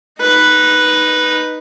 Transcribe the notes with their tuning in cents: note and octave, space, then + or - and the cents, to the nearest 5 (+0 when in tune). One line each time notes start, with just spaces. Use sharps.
D#4 +0 B4 +0